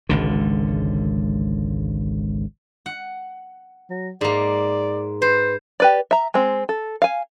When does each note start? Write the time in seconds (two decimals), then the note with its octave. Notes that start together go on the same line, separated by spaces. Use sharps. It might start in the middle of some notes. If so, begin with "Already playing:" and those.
0.09 G#1 C#2 D3
2.86 F#5
3.90 F#3
4.21 G#2 A#3 D5
5.22 B4 C5
5.80 G4 B4 D5
6.11 E5 A#5
6.34 G#3 C4
6.69 A4
7.02 F5 G#5